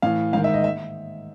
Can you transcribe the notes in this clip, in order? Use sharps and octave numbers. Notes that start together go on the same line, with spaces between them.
A2 E3 F5
G#2 D#3 F5
E5
D#5
E5